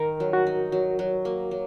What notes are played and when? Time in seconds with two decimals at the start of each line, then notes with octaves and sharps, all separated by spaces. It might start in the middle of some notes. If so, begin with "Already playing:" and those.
Already playing: D#3 A#4
0.20 F#3
0.33 F#4
0.47 D#4
0.72 F#3
0.99 F#3
1.25 A#3
1.51 F#3